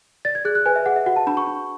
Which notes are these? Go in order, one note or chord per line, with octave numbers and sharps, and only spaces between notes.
D5 A6
G#6
G#4 F#6
F#6
B4 G#5
E5
G#4 F#5
E5
F#4 F#5
A5
D4 B5
C#6
D4